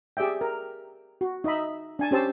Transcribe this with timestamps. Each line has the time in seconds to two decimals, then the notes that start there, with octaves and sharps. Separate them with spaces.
0.17 G4 G#4 D5 E5 G5
0.41 A#4
1.21 F#4
1.44 D#4 D#5 E5 B5
1.99 D4 G#5 A5
2.11 C#4 G4 C5 A5 E6